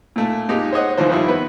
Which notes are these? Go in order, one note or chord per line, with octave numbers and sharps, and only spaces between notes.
A#2 A3 A5
A#2 G#3 D#4 G4
C5 C#5 D#5 F#5
D#2 G#2 E3 F3 C5
G2 D#3 F3 D#4 E4
B3 B4